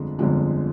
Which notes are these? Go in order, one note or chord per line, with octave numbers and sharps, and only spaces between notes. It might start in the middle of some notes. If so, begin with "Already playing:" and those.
Already playing: G1 F2 D3 F3 G#3
G1 F2 D3 F3 G#3